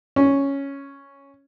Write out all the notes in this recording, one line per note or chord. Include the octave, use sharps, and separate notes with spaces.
C#4